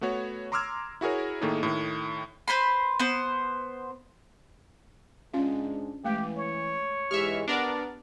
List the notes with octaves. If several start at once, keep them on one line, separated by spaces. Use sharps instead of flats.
A3 B3 F#4 C#5
A#5 C6 D6 E6 F6 G#6
E4 F#4 G#4 A#4 C#5
A2 D#3 A3 A#3 D#4 G#4
A2 D#3
B4 C5 B5 C6
B3 C5
G#2 G#3 C#4 D4 F4 F5
E3 G#3 A3 G4 G5
C#5
G#2 E3 G#3 G4 E5 C#6 F6
B3 D4 A#4 D5